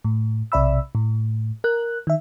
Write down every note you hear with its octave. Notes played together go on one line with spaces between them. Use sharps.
A2
B1 C3 D5 E5 B5 E6
A2
A#4 F#6
D#3 E5